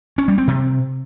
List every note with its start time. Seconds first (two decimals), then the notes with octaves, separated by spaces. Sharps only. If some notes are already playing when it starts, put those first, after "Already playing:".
0.18 C#4
0.28 G3
0.38 C4
0.48 C3